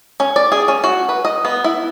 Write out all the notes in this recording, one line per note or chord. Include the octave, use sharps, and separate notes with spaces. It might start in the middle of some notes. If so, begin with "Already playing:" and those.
C#4
D5
G#4
C#4
F#4
B4
D#5
B3
E4